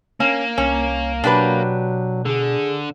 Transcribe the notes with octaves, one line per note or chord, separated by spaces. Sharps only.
A#3 C#4
C2 C#4
B2 F#3 D4 G4 B4
D3 G#4